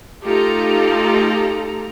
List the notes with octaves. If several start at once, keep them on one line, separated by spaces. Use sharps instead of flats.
A3 D#4 F4 G4 A4 A#5